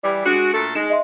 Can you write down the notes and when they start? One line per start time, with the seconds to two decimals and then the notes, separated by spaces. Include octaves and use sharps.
0.03 E3 G3 D5
0.26 G#3 D4 F#4
0.53 A#2 A3 A4
0.75 G#3 D#4 G#4 E7
0.90 D#5 E5 C6